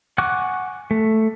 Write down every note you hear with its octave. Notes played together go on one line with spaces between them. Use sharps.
F#5 G#5 C#6 D6 F#6
A3